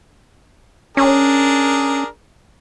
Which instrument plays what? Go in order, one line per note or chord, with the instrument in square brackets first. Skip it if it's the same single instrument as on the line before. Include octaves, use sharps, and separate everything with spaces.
[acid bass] C#4 [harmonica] D4 G#4 A#4